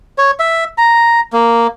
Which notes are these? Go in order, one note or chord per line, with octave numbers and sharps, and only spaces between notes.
C#5
E5
A#5
A#3